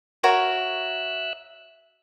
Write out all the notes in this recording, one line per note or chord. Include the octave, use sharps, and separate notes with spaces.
F#4 A#4 C#5 E5 E6 F#6